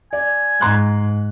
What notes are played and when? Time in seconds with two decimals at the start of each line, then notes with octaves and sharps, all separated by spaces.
0.13 D5 G#5
0.61 G#2 A#5 C6 F#6